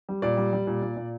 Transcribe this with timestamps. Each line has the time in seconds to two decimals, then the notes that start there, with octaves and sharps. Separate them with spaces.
0.09 G3
0.22 A#2 D5
0.37 G3
0.53 G3
0.67 A#2
0.82 A#2
0.97 A#2